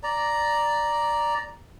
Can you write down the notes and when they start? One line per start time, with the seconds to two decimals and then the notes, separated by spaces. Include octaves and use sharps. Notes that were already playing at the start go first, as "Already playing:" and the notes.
0.03 D5 A#5